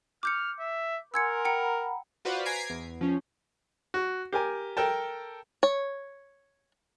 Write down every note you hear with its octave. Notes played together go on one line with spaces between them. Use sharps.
D6 F6 G6 C#7
E5
A#4 F#5 G#5 C6 E6 G#6 C#7
F#5 G5 A#5 B5 C#7
F4 F#4 B4 C5 D5 F5
G#5 A#5 G#6 B6 C7 D7
E2
F3 C#4
F#4
G4 A#4 G#5
A4 A#4 G5 A5
C#5